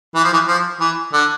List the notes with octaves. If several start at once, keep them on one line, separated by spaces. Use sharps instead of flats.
E3
F3
E3
F3
E3
D3